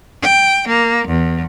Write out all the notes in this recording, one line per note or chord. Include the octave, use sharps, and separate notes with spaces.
G5
A#3
E2